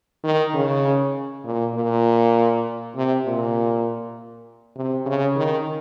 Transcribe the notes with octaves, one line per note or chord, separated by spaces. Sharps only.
D#3
C#3
A#2
A#2
C3
A#2
C3
C#3
D#3